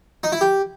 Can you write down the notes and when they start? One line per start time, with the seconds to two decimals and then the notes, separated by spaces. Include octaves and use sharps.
0.23 D#4
0.32 E4
0.41 G4